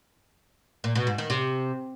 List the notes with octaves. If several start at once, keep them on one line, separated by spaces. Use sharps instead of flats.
A#2
B2
G#2
D#3
C3